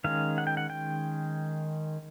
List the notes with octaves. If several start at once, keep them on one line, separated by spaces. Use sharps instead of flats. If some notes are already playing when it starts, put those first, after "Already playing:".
D#3 G#3 C#4 F5
F#5
G5
F#5
G5